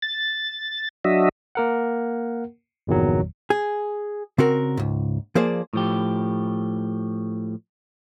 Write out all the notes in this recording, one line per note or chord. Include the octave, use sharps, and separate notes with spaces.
A6
F#3 D4 F#4 D#5 E5
A#3 A#4 F#5
G1 E2 A#2 D#3 F#3
G#4
C#3 C4 F#4 A#4
C#2 G#2
F3 A#3 G#4 C5 D5
A2 F3 G4